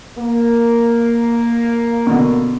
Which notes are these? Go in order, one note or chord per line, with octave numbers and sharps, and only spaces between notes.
A#3
B2 D3